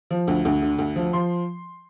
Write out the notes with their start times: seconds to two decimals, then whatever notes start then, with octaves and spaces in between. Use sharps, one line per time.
0.11 F3
0.28 D2
0.45 D2
0.62 D3
0.79 D2
0.96 F3
1.13 F3 C6